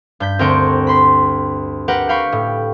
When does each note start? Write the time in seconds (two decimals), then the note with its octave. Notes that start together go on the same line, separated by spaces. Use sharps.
0.20 G2 G6 B6
0.39 D2 C4 A#4 G5 C#6
0.87 B5 C6 B6
1.88 G4 A#4 B4 F#5 G5
2.09 F5 G5 B5 C#6
2.32 A2